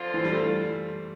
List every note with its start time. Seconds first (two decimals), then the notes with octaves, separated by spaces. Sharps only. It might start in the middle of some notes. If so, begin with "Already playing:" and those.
Already playing: D3 F3 C4 F4
0.14 E3
0.25 G3
0.32 A3